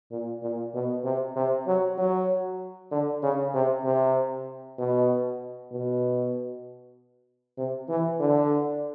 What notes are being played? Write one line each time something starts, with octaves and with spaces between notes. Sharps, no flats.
A#2
A#2
B2
C3
C3
F#3
F#3
D3
C#3
C3
C3
B2
B2
C3
E3
D3